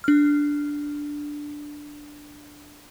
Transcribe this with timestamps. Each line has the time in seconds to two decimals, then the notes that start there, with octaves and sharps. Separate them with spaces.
0.04 D4 F6